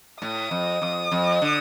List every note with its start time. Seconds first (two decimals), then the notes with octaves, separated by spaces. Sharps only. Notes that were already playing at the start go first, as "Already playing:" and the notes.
0.22 A2 D#6
0.51 F2
0.82 F2
1.12 F2
1.42 D3